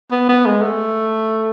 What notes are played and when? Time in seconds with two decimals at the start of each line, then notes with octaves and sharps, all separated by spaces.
0.12 B3
0.29 B3
0.46 G#3
0.62 A3